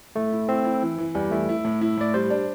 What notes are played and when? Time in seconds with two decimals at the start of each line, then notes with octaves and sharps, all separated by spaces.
0.16 A2 A3
0.32 E4
0.49 C4 E4
0.65 E4
0.82 E3
0.98 E3
1.15 E2 G3
1.31 A3 E4
1.49 E4
1.65 A2
1.81 E4
1.97 A2 D5
2.14 G3 C5
2.30 D4